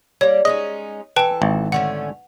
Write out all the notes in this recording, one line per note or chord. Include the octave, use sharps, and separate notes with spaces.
G3 A#3 C#5
G#3 C#4 D#4 D#5
E3 A4 B4 G5 A5
G#1
D3 A3 C#4 F#5